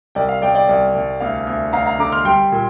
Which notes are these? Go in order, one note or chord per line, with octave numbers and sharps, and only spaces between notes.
C2 D5 G5
F5
C2 D5 G5
D5 G5
C2 D5
C2
D2 F5
D2
D2 F5 A#5
F5 A#5
D3 A#5 D6
C6 F6
G3 G5 C6
A#2